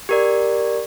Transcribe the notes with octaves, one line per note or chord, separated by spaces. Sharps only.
G4 A#4 D5